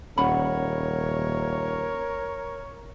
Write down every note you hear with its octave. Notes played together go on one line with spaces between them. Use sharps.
D#1 C#4 A#4 C#5 F#5 B5